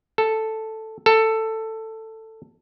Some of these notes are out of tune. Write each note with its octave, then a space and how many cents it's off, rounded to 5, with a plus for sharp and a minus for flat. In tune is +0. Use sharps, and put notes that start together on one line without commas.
A4 +0
A4 +10